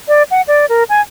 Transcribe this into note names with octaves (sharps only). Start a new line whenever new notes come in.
D5
F#5
D5
A#4
G#5